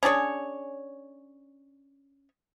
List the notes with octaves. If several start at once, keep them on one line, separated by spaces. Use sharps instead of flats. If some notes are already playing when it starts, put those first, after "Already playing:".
C#4 D4 G#4 C#5